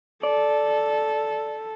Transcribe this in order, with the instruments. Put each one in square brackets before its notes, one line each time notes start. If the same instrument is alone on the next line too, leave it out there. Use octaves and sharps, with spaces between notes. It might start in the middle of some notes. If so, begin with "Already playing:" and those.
[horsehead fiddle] A4 [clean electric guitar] D5